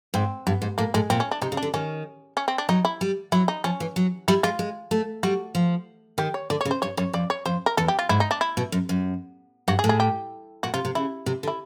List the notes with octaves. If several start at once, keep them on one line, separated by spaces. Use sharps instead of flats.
G#2 C4
G2 B3
G#2
A2 A#3
A2 G#3
A#2 C4
C#4
D4
C3 D#4
C#3
D4
D3
D#3 C#4
C#4
C4
D4
F#3 D#4
E4
G3
F#3 E4
D#4
F3 C#4
E3
F#3
G3 E4
G#3 F4
G#3
A3
G3 F#4
F3
D#3 G4
C#5
D3 D5
C#5
C#3
C5
G2 C#5
F#2 C#5
F2 D5
C#5
F2 C5
A#4
E2 A4
G4
F4
G#2 E4
D#4
D4
E4
B2
F#2
F#2
G2 F#4
G#4
A2
G#4
G4
A#2 F#4
C3 F4
C3
C#3 E4
C3
D3
E4